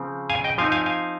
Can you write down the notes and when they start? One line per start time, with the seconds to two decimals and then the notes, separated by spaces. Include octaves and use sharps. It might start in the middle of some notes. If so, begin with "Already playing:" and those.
Already playing: C#3 F3 C4
0.30 F5 G#5
0.44 D#5 G5
0.58 F3 C4 D#4 F5 G#5
0.72 F5 G#5
0.86 F5 G#5